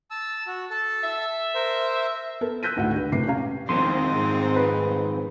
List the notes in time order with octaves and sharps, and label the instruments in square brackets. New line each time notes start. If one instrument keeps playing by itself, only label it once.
[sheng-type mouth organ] A5 E6
F#4
A4 A5
[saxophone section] E5
[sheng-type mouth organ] A#4 C5
[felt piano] B3 A4 A#4
E6 F#6 G6 A#6 B6 D#7
G#1 D2 A2 D3 F#4 F#5
D3 G4 B4
E1 A2 C3 B4 D6 C7
C#4 G4 F5 A#5
[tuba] E1 [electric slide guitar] F2 D#3 [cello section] G#3 C4 D#4 [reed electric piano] C6
[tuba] G#2
[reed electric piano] B4